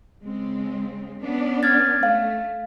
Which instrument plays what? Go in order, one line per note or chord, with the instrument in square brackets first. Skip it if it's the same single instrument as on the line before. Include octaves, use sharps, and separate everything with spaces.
[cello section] C#3 G#3 C4
B3 C#4 D4
[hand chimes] F6 G#6 A6
[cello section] A3 [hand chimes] F5